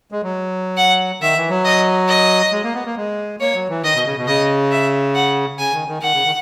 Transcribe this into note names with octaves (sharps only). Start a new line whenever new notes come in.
G#3
F#3
F#5
D#3 E5
E3
F#3
D#5
D#5
G#3
A#3
B3
A#3
G#3
A#3 C#5
F#3
E3
D#3 D#5
B2
C#3
B2
C#3 D#5
E5
F#5
C#3 G#5
D#3
D#3
D#3 F#5
C#3
D#3